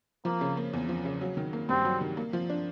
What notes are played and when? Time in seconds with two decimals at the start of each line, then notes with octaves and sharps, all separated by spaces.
0.25 F3 A#3
0.41 C#3
0.57 A#3
0.73 E2
0.89 F3
1.05 C#3
1.21 F#3
1.37 D#3
1.53 A#3
1.69 G2 C4
1.85 F#3
2.01 D#3
2.17 A#3
2.33 F3
2.49 D4